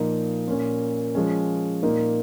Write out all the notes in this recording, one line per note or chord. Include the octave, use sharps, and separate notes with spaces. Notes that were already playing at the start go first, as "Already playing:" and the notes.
Already playing: A#2 F3 A#3 D#4
A#2 A#3 C#4
F3 G#3 C#4
A#2 A#3 D#4